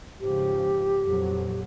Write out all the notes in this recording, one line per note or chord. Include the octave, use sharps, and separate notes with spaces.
G#2 C#3 F3 G4
F2 A#2 F#3